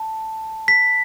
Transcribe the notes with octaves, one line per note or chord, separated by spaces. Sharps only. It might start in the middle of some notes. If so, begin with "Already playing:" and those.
Already playing: A5
B6